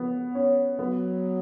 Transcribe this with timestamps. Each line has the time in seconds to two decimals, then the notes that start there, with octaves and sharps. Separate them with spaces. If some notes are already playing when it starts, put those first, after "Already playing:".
Already playing: F3 B3
0.35 C#4
0.79 F#3 B3